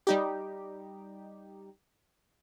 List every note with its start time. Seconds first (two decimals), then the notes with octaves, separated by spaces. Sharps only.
0.07 G3 D#4 G4